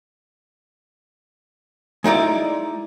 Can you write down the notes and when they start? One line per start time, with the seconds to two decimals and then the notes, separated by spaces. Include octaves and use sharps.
2.04 G#3 D#4 E4 D5 A#5